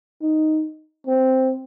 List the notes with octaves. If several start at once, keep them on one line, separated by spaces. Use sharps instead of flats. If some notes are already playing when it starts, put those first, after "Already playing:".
D#4
C4